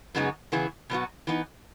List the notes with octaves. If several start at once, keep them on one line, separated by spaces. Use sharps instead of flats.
F#2 C#3 G#3 B3 D#4
C#3 E3 B3 E4 G#4
B2 F#3 B3 F#4
E3 B3 D#4